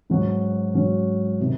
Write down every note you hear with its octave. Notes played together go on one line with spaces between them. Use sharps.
G#2 F#3 C#4 F#4
G#2 F#3 C#4 F#4
C3 D#3